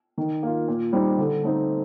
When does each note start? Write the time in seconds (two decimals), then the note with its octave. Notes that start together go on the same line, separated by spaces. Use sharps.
0.18 D#3
0.43 A#3 F4
0.68 A#2
0.93 G3 C4 D#4
1.18 D3
1.43 A3 C4 D#4